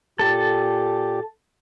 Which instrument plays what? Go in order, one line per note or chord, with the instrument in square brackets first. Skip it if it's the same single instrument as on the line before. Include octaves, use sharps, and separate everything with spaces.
[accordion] A#2 G4 [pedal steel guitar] A4 A5